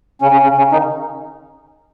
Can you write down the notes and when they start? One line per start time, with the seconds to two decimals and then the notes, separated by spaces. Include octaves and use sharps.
0.22 C#3 C#4
0.32 C#3 C#4
0.43 C#3 C#4
0.58 C#3 C#4
0.72 D#3 D#4